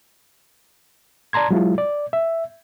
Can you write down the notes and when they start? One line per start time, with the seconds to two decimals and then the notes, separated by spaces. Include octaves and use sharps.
1.33 D5 A5 A#5 C6 G#6
1.51 F#3 G#3 E4 F4
1.78 D5
2.13 E5